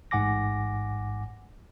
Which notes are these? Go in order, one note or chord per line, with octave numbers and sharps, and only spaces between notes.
A1 G#2 F#5 G#5 D6 A#6